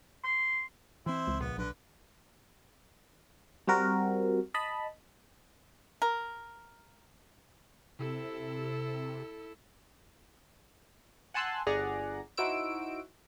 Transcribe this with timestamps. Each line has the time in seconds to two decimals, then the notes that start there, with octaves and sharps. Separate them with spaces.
0.24 C6
1.06 E3 C4 E4 C5
1.28 C#2
1.40 A#1 B3
1.57 B1 D3 B4
3.68 G3 C4 F#4 A#4
4.54 D#5 A5 B5
6.02 A#4
7.99 C3 E4 A4
11.34 F#5 G#5 A5 C6 E6 F#6
11.67 G1 G#4 D5 F#5 A#5
12.37 D#4 E4 F#4 C5 E6 D7